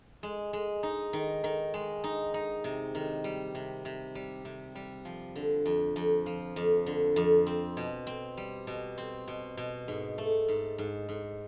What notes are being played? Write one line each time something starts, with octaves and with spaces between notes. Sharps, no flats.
G#3
G#3
D#4
D#3
D#3
G#3
D#4
D#4
C3
D#3
G3
C3
C3
G3
C3
G3
F3
D3
F2
F2
F3
F2
D3
F2
C4
B2
C4
G3
B2
C4
B2
B2
G#2
A3
G#2
G#2
G#2